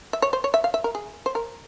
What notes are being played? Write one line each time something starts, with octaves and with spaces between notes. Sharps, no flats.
E5
C#5
C5
C#5
E5
F5
E5
A#4
G#4
C5
A#4